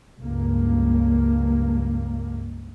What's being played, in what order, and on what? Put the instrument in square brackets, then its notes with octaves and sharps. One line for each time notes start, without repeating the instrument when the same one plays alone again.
[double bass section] C#2 G2 A#3